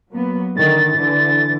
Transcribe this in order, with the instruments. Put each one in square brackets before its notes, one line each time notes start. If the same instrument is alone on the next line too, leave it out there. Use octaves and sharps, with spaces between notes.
[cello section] F#3 A#3 B3
[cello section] D3 D#3 [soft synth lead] A6
[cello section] D3 E3